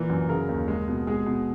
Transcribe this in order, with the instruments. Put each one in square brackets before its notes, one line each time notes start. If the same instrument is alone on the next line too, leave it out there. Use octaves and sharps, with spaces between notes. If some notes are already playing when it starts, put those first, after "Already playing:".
Already playing: [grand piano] A#2 E3 A#4
F#2
C#3 A#4
D#2
G#3
B2
G#3 G#4
B2